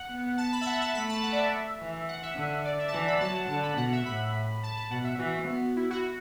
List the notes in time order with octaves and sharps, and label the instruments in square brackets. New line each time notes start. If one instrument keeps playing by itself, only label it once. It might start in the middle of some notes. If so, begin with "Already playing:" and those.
Already playing: [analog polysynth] F#5
[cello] B3
[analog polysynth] A5
B5
E5
F#5
A5
[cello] A3 [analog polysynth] B5
[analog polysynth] A5
F#5
D5
E5
[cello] E3
[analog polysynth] F#5
E5
[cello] D3
[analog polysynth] D5
E5
A5
[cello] E3 [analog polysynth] F#5
[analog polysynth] B5
[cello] F#3 [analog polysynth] A5
[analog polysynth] F#5
[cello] D3 [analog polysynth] A5
[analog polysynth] B5
[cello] B2 [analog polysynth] F#5
[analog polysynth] E5
[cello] A2 [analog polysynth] B5
[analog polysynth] A5
A5
[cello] B2 [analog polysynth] F#5
[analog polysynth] E5
[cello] E3 [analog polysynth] F#4
[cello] B3
[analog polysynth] E4
F#4
F#4